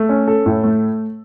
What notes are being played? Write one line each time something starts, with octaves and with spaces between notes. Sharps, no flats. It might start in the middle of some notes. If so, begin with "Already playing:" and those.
Already playing: A3
C#4
A4
A2
A3